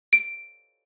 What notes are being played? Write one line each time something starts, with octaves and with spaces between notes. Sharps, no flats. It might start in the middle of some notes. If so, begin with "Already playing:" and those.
D7